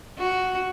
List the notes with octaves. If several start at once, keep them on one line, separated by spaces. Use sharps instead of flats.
F#4